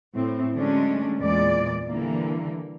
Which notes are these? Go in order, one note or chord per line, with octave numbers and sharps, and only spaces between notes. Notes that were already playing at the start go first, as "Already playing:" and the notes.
A2 C4
D3 F#3 G#3 A3 C#4 D4
E2 A#2 G#3 D5
D3 E3 G3 A#3